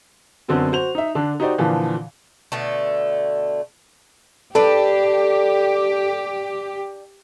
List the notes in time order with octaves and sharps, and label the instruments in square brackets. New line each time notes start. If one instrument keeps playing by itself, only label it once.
[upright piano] F#2 D3 B3 C4 F#4
F#4 C5 F7
D#4 E5
D3 D4
D#4 F#4 G4 C5 D5
A#2 D3 E3 F3
[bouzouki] B2 D3 A3
[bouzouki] D4 B4 [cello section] G4 [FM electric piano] A4